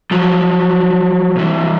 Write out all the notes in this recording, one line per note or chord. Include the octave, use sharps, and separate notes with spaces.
F3 F#3
C2 E3